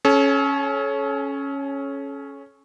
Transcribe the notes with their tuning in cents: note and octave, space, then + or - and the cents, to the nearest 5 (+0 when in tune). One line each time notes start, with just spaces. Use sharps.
C#4 -5 A4 -40